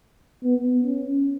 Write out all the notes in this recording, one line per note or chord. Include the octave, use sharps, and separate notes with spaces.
B3
C#4